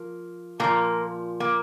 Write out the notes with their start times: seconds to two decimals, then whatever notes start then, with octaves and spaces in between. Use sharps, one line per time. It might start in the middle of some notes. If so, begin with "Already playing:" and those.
Already playing: F3 A#3
0.60 A#2 F3 A#3
1.40 A#3